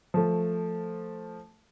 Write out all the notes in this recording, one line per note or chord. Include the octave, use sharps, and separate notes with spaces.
F3 A3